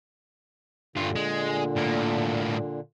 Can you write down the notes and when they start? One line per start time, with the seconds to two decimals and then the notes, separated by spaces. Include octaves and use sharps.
0.96 G2 A#2 D3 F4
1.15 G#3
1.76 A2 A#3